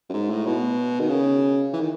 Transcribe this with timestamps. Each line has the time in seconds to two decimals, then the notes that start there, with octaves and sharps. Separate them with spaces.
0.10 F#2
0.14 G#2
0.30 A2
0.46 B2
1.00 D#3
1.09 C#3
1.73 E3
1.81 D#3